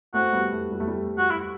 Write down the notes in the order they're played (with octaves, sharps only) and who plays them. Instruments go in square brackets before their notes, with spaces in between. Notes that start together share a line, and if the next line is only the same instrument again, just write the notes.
[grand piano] A3 C4 [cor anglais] F#4
[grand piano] G3 B3
A3
G3
A3
G3
[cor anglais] F#4
E4